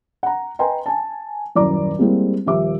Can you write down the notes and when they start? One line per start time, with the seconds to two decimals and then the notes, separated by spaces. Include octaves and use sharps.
0.23 F#5 A#5
0.59 B4 D#5 G5 G#5 A#5 C6
0.86 G#5 A5
1.55 D#1 F#2 E4 D5 A#5 D6
1.99 G3 G#3 A#3 C4 E4 G4
2.46 D#1 F3 G4 E5 D6